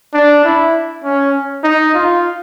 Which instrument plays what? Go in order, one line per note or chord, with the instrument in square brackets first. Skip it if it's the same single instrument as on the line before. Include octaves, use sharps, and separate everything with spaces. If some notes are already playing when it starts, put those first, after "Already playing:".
[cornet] D4
E4
C#4
D#4
F4